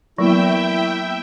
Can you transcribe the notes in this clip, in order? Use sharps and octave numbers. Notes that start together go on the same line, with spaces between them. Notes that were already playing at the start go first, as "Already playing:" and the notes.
E3 F#3 A#3 B3 E4 E5 G5